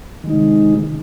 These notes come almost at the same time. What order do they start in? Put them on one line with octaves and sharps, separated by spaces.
D#3 G#3 D#4 C3